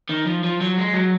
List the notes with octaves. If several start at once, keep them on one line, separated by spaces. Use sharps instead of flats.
D#3
F3
F3
F#3
G#3
F#3